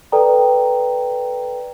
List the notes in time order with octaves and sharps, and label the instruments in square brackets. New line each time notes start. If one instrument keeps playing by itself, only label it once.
[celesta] A4 B4 D5 G5 A#5